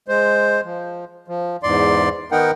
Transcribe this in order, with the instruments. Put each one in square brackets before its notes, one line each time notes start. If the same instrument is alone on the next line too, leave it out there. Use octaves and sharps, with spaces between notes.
[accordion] G#3 C5
F3
F3
E2 G#2 D5 C6
D#3 B3 D#4 A#4 F#5 G5